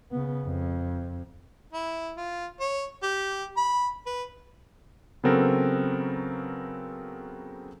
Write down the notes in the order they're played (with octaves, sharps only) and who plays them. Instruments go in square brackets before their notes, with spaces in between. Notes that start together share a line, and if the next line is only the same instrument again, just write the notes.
[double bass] C#3 B3
F2
[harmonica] E4
F4
C#5
G4
B5
B4
[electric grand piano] C#3 F#3 B3 C4 A4 A#4